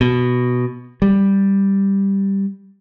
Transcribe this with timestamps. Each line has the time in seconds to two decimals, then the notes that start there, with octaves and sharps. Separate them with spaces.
0.01 B2
1.02 G3